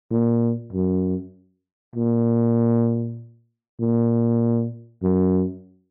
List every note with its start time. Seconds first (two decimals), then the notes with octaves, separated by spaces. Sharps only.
0.11 A#2
0.73 F#2
1.96 A#2
3.80 A#2
5.03 F#2